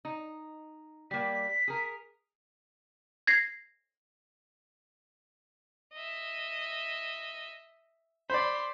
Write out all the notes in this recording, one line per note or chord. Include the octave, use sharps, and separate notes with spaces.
D#4
G3 A#3 B6
G#4 A#4
G#6 A#6 C7
D#5 E5
C5 D5 B5 C6